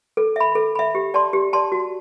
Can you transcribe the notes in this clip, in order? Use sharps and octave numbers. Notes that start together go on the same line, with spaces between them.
A4
E5 B5
A4
E5 B5
G4
D5 A5 C6
G4
D5 A5 C6
F#4